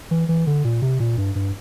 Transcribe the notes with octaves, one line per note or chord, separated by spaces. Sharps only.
E3
E3
D3
A#2
C3
A#2
G2
G2